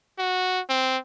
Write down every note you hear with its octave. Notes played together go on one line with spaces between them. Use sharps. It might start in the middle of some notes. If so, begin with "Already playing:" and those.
F#4
C4